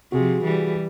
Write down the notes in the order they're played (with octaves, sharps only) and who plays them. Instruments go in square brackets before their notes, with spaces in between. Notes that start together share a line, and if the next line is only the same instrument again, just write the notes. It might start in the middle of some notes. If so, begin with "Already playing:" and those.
[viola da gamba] C3 F3 [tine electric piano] F#4 G#4
[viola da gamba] E3 G3